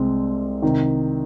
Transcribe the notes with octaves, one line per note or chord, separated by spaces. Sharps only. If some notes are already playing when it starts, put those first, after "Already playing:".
Already playing: C2 C3 G#3 C4
C3 D#3